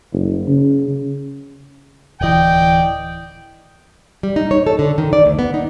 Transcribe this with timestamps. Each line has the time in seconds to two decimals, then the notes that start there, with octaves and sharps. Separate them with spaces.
0.12 F#1
0.47 C#3
2.21 D1 E3 D5 D#5 G5
4.23 G3
4.36 D#4
4.51 C#5
4.67 A4
4.79 D3
4.98 D#3
5.13 D5
5.26 D2
5.39 B3
5.54 D#4